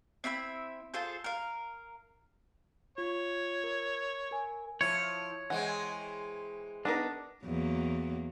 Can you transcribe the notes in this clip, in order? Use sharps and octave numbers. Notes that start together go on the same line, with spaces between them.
C4 E4 E5 B5
F4 G#4 A4 C5
A#4 F5
F4 C#5
A#4
A#4 G#5
F3 E4 C#5
E3 G#3 C4 F#5
B3 D4 D#4 A#4
E2 F#3 A#3